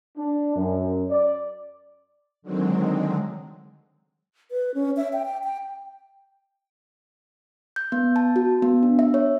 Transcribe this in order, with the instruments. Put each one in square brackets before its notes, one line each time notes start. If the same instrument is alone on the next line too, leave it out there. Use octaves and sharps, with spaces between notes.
[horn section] D4
F#2
D5
[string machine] D3 D#3 F#3 G#3 C4
[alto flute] B4
C#4
E5
G5
G5
G5
[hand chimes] G6
B3
A5
F#4
B3
D4
E5
C#5